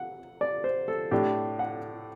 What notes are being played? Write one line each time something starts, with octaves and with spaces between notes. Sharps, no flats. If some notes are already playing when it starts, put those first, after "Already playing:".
Already playing: F#5
D5
C5
A4
A2 A3 D4 G4
F#5